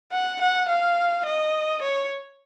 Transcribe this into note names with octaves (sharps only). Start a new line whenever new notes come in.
F#5
F#5
F5
D#5
C#5